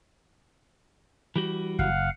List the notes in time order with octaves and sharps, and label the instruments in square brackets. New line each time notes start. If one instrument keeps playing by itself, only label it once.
[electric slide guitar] E3 G3 F#4
[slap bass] F#1 [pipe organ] F5 F#5